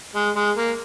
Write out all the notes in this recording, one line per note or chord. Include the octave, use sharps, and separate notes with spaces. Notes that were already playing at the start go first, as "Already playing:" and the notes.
G#3
G#3
A#3